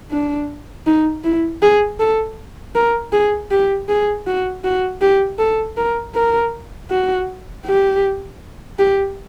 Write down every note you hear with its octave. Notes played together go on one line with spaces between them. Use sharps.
D4
D#4
E4
G#4
A4
A#4
G#4
G4
G#4
F#4
F#4
G4
A4
A#4
A#4
F#4
G4
G4